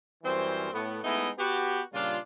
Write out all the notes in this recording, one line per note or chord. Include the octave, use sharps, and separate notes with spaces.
F#2 E3 G3 C4 C#4 C5
A2 B3
G#3 A3 B3 D#4 E4 D#5
B3 F#4 G4
A#2 C#3 G3 D4 F4